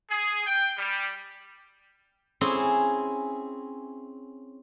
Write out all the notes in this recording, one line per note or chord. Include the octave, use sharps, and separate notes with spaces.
G#4
G5
G3
C4 C#4 E4 G#4